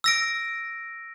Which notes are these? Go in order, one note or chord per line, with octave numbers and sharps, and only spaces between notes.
E6 A#6 D7